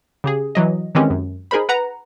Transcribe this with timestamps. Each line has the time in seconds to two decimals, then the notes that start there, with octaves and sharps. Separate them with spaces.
0.24 C#3 G4 G#4
0.55 E3 F#3 D#5
0.95 D#3 E3 G#3 C4 C#4 G4
1.10 F#2
1.51 D#4 G#4 A#4 C5 B5
1.69 B4 F#5 A#5